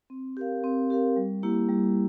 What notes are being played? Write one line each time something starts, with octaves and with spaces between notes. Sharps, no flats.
C4
G4 A#4 F5
C4
G4 A#4 F5
G3
A#3 E4 G4
G3